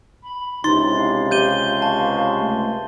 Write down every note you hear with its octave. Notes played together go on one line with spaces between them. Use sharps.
B5
C#2 C3 D#4 E4 C6 A6
F5
G4 F5 G6 D#7 G7
A5 C#6
A3